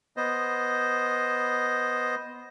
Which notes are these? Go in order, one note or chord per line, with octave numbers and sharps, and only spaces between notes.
B3 C5 D#5